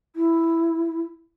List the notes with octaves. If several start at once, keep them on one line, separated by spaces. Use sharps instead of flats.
E4